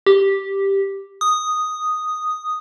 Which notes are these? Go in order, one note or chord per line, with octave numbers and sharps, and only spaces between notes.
G4
D#6